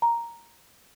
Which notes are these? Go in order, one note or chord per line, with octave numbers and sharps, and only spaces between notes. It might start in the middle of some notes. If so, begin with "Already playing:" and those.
A#5